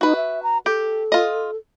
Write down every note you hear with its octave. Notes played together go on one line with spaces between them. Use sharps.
D#4 F#4 B4
E5
A#5
G4 A4
F4 D#5